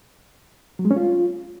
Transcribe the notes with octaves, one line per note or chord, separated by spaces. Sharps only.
F#3
G#3
C#4
F4